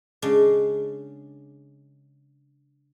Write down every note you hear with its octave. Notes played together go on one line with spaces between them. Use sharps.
C#3 G#3 C#4 D4